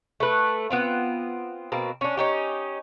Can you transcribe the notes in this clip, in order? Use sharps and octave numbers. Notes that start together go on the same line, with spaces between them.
A3 B4
B3 C4 F4
B2 A#3 C4
C#4 D4
C#4 D#4 G4